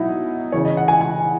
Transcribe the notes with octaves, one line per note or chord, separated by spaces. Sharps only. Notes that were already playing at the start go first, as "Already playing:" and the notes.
Already playing: B2 F#3 D#4 E4
C#3 E3 C#5
D#5
F#5
G#5
G#5